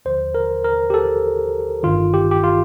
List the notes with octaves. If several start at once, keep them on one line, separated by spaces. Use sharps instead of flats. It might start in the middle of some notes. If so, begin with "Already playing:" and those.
D#2 D3 F3 C5
A#4
A#4
G4
A4
G1 G2 D#3 F4
G4
G4
F4